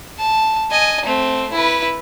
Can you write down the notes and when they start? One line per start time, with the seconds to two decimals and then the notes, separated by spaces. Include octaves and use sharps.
0.19 A5
0.71 D#5 G#5
1.05 A3 C4
1.53 E4 B4